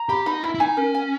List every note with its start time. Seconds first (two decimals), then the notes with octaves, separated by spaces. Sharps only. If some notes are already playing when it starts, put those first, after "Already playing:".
Already playing: A#5
0.09 G4 B5
0.26 D#4 B5
0.43 E4 B5
0.55 E4
0.60 D#4 G#5
0.77 C#4 A#4
0.94 G#5